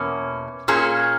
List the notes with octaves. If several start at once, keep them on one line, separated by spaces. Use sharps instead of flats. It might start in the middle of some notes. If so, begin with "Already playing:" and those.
Already playing: E2 B2 A#3 C#4
A#2 A#3 C#4 G#4